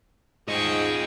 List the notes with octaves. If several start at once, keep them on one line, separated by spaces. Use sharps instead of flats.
G#2 F4 G#4 D#5 G5 C#6